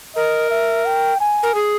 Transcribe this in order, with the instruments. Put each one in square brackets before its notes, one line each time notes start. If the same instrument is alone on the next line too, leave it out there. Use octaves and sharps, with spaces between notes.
[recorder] A#4 [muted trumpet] D#5
[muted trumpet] E5
G5
G#5
[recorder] A#4
G#4